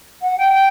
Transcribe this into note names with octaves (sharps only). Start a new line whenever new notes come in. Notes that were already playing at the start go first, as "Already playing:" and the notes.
F#5
G5
G5